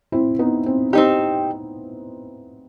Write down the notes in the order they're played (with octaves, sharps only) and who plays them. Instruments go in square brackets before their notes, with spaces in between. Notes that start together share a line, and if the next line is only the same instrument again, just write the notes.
[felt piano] C4 E4
B3 D#4
C4
[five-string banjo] C4 D#4 G4